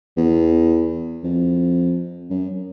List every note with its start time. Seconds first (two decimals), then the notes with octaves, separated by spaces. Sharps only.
0.17 E2
1.24 F2
2.30 F#2